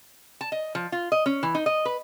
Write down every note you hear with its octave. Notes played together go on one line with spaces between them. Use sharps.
A5
D#5
F3
F4
D#5
C#4
E3
D#4
D#5
B4